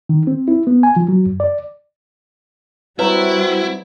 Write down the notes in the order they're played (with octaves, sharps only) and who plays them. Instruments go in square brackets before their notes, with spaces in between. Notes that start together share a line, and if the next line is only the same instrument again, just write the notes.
[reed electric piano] D#3
C4
E4
B3
G#5
F3
F#3
F#2
D5
[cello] G3 [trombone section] C4 F#4 [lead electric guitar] E4 [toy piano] B4 C#5 A#5